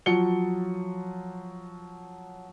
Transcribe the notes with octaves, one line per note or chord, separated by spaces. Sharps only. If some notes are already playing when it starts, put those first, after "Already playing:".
F3 F#3 C#7 G7